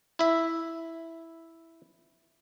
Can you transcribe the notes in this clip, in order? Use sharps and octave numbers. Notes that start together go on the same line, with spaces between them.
E4 E5